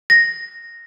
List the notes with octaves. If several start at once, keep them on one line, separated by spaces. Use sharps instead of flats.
A#6